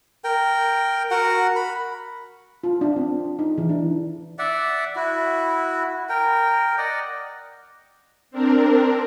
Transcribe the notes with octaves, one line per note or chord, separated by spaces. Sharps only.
A#4 G5
F#4 A#4 F#5
B5
F4
D4
C4
D#4
E3
D4
D5 E5 F#5
E4 F#4
A#4 G5
D5 D#5 F#5
C4 D4 A#4